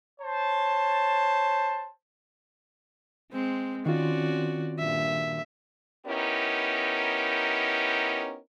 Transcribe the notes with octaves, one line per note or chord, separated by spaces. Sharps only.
C5 C#5 A5
G#3 C4
D#3 C4 C#4 F4 F#4 D5
G2 A#2 E5
B3 C#4 D#4 E4 G4 A#4